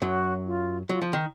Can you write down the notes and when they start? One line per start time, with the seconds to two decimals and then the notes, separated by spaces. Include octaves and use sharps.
0.01 F#2 F#3 F#4
0.45 F4
0.89 F#3 F4
1.02 F3
1.13 D#3